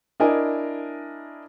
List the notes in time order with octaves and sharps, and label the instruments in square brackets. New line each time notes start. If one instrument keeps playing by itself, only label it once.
[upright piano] D4 E4 A#4 D#5 G#5